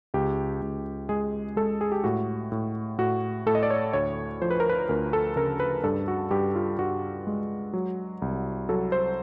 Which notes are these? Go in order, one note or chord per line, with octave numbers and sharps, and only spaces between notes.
C#2 G4
C#2
G#3 G#4
G#3 A4
G#4
G4
A2 F#4
A2
A2 F#4
A2 A4
D#5
D5
C#5
D2 C#5
F3 C5
B4
A#4
B4
D2 A#4
A4
C#3 A#4
B4
G2 A4
F#4
G2 G4
F4
G2 F#4
G#3
F#3
C2
F#3 A4
C5